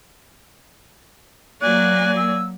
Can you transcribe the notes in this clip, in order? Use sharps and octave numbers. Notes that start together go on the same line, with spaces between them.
F#3 A#3 D5 G#5 F#6
E6